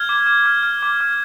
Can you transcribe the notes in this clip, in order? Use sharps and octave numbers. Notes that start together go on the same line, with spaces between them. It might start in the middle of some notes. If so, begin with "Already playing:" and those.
Already playing: F6 G#6
D6
D6
F6
F6
D6
F6